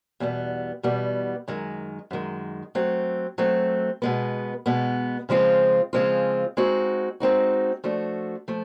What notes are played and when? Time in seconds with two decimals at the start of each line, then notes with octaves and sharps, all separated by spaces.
0.20 E2 B2 G3 B3
0.83 E2 B2 G3 B3
1.48 F#2 D#3 G#3
2.11 F#2 D#3 G#3
2.75 F#3 A3 C4
3.38 F#3 A3 C4
4.02 B2 G#3 B3
4.66 B2 G#3 B3
5.29 C#3 F3 G#3 C4 F4
5.93 C#3 F3 G#3 C4 F4
6.57 G#3 C4 D#4 F#4
7.20 G#3 C4 D#4 F#4
7.84 F3 A3 D4 F#4
8.48 F3 A3